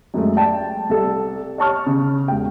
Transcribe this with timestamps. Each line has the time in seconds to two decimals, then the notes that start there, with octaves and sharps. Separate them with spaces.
0.14 F#2 G#3 A3
0.36 D5 G5 A5
0.89 C2 A4
1.58 C#5 A5 C#6 F6
1.87 C#3
2.28 E1 G5